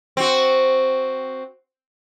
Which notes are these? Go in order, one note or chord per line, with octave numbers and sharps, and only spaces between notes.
C4 F#4